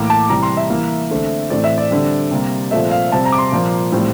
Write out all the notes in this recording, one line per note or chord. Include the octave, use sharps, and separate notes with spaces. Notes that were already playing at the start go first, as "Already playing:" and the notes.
Already playing: A2 E3 A#3 D6
A5
C3 E3 G3 A#5
C6
E5
E3 A#3
D3 A3 C4
A2 E3 A3 C4 D5
E5
D5
D3 G3 C4
C3 G3 A#3
A#2 F3 A3 C4 E5
F5
C3 G3 C4 A5
A#5
D6
C6
A#2 F3 A#3
A2 E3 G3 C4